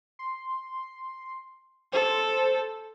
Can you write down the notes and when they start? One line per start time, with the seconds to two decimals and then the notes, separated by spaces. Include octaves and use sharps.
0.19 C6
1.93 A4 C5